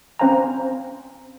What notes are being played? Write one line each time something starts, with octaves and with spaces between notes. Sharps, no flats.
C4 C#4 C5 F5 G#5 A#5